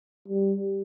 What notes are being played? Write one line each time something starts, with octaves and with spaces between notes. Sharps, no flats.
G3